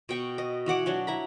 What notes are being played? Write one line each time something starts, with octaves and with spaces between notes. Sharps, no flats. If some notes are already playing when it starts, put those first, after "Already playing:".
B2 G5 C#6
D#5
E3 F#4 F#5 D6
F#3 D4 F#4
E4 A#5 B5